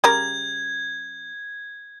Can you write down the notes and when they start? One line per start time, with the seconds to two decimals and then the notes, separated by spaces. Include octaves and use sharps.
0.04 C#3 G3 A#4 G#6